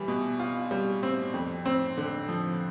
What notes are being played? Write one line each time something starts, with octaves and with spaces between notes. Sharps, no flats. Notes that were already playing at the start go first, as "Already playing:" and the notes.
Already playing: E3 G3
B2
F4
G3
C4
F2
C4
D3
F3